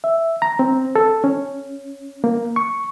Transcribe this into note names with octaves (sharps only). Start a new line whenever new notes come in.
E5
A#5
C4
A4
C#4
A#3
C#6